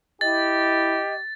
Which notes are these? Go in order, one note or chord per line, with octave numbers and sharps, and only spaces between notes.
E4 G4 D#5 A6